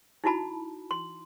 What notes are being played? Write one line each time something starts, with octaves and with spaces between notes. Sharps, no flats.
D#4 E4 F#4 A5 B5
C6